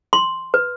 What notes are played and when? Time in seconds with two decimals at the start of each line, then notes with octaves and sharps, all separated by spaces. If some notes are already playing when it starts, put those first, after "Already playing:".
0.13 C6
0.54 B4